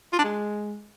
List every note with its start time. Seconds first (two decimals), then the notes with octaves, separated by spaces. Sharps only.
0.13 F4
0.18 D4
0.24 G#3